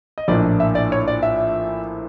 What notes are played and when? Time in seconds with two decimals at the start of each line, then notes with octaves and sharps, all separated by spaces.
0.18 D#5
0.28 A#1 A2 F3 A#3 D4 D5
0.60 E5
0.75 D5
0.92 C#5
1.08 D5
1.23 E5